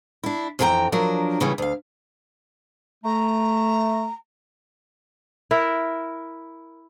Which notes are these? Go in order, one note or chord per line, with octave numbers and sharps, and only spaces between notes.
D4 E4
F2 E3 F4 G#4 G5 A#5
F3 F#3 D4 A#4
E2 C#3 E3 G3 A3
D2 F5
A3 A#5
E4 A#4